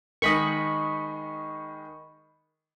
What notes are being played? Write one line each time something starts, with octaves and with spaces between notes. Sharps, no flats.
D#3 G#3 D#4 D#5 B5 C#6